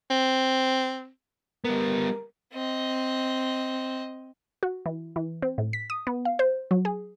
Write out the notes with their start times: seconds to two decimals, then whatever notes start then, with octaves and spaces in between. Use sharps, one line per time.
0.10 C4
1.64 G3 B3 A#4
2.52 C4 D#5
4.63 F#4
4.86 E3
5.16 E3
5.42 C4
5.58 A2
5.73 B6
5.90 D#6
6.07 B3
6.25 F5
6.39 C5
6.71 F#3
6.85 G#4